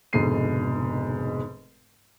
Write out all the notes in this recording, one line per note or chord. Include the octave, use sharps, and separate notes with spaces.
F1 G#2 B2 D3 C7 D#7